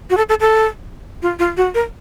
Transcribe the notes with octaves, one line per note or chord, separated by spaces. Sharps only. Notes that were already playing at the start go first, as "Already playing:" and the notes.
F#4
A4
A4
A4
F4
F4
F#4
A#4